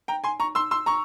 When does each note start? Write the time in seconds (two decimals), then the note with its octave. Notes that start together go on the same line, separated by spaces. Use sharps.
0.08 G5 A#5
0.24 G#5 C6
0.40 A#5 C#6
0.55 C6 E6
0.71 C6 E6
0.86 A#5 C#6